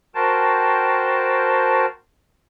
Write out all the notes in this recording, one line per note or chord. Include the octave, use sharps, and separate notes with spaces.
F#4 A#4 C5 G5 A5